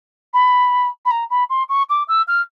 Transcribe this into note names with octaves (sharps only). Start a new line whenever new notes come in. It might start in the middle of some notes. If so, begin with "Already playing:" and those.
B5
B5
A#5
B5
C6
C#6
D6
E6
F6